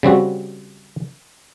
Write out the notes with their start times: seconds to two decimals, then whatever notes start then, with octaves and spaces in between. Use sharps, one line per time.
0.03 C#3 G3 C4 F#4